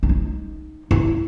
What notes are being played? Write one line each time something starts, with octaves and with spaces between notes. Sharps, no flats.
D4
D#4
E4